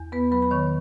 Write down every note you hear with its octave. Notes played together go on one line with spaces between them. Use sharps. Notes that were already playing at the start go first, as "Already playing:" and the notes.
Already playing: E2
B3 B4 B5
F#3 B4 B5
B5
D#3 C#5 C#6